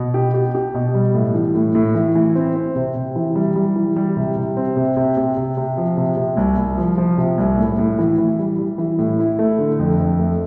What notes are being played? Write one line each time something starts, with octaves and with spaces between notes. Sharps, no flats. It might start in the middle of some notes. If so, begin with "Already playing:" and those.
Already playing: B2
G4
G4
G4
B2
G3
A2
E3
A2
A2
E3
E3
C4
C4
C3
C3
E3
G3
G3
E3
G3
C3
C3
C4
C3
C3
C3
C3
C3
F3
C3
C3
C2
C2
F3
F3
C3
C2
A2
A2
E3
E3
G3
G3
E3
A2
E4
A3
D3
F2
F2
A3